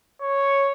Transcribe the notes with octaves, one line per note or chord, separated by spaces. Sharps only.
C#5